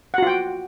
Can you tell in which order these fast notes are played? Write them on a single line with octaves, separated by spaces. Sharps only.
F#5 F#4 F4 G5